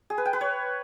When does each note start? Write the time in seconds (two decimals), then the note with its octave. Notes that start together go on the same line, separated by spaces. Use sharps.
0.10 G#4
0.18 B4
0.25 G5
0.33 B4
0.41 C#5